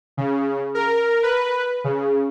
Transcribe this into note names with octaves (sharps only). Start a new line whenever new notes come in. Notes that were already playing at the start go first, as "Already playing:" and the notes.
C#3
A#4
B4
C#3